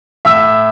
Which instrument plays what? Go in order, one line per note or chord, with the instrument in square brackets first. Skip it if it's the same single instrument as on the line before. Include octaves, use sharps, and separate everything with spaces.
[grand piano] A2 E5 E6